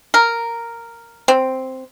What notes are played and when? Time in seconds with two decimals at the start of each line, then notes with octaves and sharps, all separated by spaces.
0.14 A#4
1.28 C4